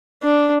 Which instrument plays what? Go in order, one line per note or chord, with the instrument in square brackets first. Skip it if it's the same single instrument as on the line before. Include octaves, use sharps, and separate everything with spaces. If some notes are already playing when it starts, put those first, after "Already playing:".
[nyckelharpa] D4